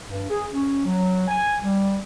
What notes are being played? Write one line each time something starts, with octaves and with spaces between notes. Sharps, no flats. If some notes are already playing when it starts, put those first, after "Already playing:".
G2
G#4
C#4
F#3
G#5
G3